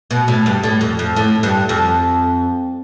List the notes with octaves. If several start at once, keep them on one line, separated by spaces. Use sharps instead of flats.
B2
A2
G2
A2
F2
F2
A2
G2
F2